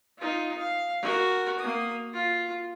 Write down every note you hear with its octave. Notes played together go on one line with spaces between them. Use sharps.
D#4 F4
F5
F#4 A#4
A#3 D#6
F4